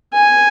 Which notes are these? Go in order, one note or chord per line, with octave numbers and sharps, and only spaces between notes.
G#5